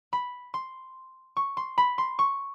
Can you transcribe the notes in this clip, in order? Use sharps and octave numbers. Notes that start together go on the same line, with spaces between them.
B5
C6
C#6
C6
B5
C6
C#6